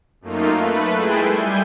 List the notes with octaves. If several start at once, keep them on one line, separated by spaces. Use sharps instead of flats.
F#2 A3 A#3 D#4 F4
A3 B4
G#3 E4 G#4 A4 G5
G3 G#5 G6